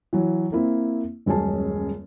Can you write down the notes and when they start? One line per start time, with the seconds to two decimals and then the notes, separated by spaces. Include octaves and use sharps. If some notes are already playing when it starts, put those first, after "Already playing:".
0.13 E3 F#3
0.52 A#3 C4 E4
1.26 D#1 F#2 G#3 C#4 G#4 A5